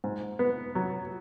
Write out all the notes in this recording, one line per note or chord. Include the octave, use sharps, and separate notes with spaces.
G#2
B3
F#3